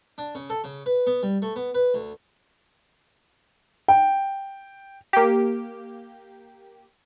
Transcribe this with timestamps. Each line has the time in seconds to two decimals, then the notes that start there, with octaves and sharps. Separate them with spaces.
0.18 D4
0.35 C#3
0.50 A4
0.64 C#3
0.86 B4
1.07 B3
1.23 G3
1.42 A3
1.56 B3
1.74 B4
1.94 D2
3.88 G5
5.13 A#3 G4